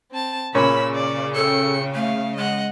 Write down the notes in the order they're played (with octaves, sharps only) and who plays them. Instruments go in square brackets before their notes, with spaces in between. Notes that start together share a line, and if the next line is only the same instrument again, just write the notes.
[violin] C4 A5
[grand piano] A#2 C#4 [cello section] C#3 [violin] B5 E6
[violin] D5
[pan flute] A4 [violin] G5 C#7
[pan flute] A3 [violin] F5
[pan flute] G#3 [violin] D#5 F#5